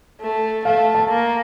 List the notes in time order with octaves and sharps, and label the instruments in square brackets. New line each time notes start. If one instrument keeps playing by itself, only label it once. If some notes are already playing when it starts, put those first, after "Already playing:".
[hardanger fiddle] A3
[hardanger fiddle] A3 [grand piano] F5
[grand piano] A5
[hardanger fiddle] A#3